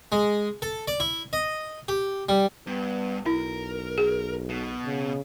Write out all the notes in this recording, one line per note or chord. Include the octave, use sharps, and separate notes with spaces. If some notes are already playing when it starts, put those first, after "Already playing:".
G#3
A4
D5
E4
D#5
G4
G3
G2 B3
B1 E4 A#4
G#4
B2
C#3